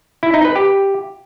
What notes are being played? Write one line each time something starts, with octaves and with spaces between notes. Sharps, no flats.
E4
D#4
B4
G4